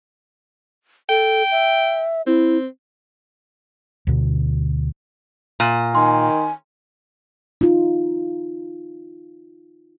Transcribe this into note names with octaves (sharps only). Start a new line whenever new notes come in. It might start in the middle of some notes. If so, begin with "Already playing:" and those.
A4 G5
E5
C4 E4
D2 B2 D3
A#2
D#3 G#5 C6
D#4 F4